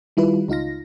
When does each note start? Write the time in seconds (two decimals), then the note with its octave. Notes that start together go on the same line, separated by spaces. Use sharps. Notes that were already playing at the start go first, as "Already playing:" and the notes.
0.17 D#3 G3 E4 F4 B4
0.48 C#2 D#4 F4 F5 A#6